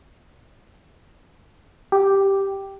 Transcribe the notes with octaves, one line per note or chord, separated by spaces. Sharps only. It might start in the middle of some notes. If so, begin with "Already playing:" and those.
G4